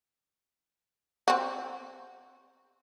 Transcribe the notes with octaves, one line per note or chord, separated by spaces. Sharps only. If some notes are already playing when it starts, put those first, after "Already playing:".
C4 F#4